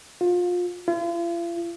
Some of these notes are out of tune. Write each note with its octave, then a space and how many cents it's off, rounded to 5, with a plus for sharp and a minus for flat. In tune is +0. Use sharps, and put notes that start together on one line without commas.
F4 +25
F4 -45